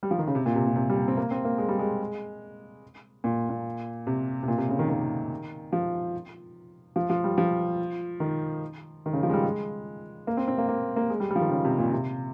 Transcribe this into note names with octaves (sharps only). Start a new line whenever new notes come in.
G3
F3
D#3
C#3
C3
A#2
C3
A#2
C3
G3
C4
A#3
C4
A#3
G#3
G3
G#3
A#2
A#2
C3
C3
A#2
C3
C#3
D#3
D#3
F3
F3
F3
G3
F3
D#3
D#3
C#3
F3
G#3
G3
G#3
A#3
C4
C4
A#3
A#3
A#3
G#3
G3
G3
F3
D#3
C#3
C3
A#2
C3